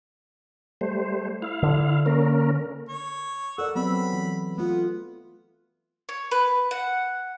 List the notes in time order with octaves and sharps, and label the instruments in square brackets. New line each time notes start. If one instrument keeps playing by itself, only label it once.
[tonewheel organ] G3 A3 C5
E4 F5
[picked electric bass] D3
[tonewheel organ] A#3 C#4 A#4
[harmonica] C#5
[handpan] A4 A#4 D5 [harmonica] F#5 E6
[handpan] F#3 B3 C4 [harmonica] B5
[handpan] E3
[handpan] A3 F4 [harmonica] B3
[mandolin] C#5
B4
F#5